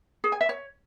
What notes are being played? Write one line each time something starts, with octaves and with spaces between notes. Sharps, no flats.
G#4
G#5
E5
C#5